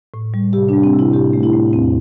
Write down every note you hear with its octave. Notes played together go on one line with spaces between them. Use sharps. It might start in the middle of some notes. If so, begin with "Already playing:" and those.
A2
G3
C3 G4
G3 D4
C4
C3
E4
A2 G4
A3
E4
A2
E2 C4